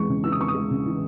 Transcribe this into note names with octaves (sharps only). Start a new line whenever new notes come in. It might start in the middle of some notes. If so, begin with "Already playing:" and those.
Already playing: E2 G#3 C#6
C#3
E3 E6
D#6
E2 C#6
D#6
G#3
C#3
E3